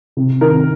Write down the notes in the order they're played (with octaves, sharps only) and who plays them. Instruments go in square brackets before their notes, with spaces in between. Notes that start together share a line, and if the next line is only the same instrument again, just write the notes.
[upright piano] C3
D#3 A#4